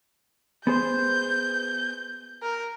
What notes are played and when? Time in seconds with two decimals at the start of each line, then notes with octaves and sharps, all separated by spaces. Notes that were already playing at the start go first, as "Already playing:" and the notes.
0.67 B3 G#4 C5 G6
2.43 A#4